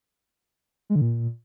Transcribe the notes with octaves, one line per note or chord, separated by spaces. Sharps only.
G#3
D3
A#2